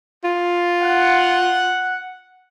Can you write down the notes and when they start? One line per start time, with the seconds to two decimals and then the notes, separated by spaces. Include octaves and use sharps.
0.24 F4
0.82 F#5